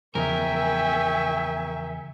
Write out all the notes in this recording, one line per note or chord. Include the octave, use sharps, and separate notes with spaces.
E2 C#3 F3 A#4 E5 G5 G#5 C#6